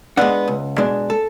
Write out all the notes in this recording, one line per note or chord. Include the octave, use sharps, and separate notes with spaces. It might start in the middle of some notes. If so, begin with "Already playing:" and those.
G#3 B3 D4 F#5
C#2
B2 G#3 D4
A4